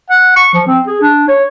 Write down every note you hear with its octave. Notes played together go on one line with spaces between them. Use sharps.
F#5
C#6
F3
C4
G#4
D4
C#5